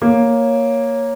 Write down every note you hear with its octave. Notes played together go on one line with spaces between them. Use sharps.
A#3 C#5